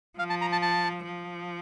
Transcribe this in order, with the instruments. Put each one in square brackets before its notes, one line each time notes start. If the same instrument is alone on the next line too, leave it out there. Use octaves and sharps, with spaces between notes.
[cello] F3 [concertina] F5
[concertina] A5
A#5
A5
A5
[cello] F3